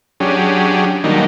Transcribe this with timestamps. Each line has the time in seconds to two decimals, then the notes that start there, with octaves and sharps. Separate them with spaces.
0.20 F#3 C#4 D4 G4 G#4
1.04 D#3 F#3 G3 A#3 D4 D#4